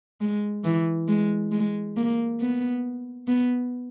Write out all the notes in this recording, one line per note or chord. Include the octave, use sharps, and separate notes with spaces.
G#3
E3
G#3
G#3
A#3
B3
B3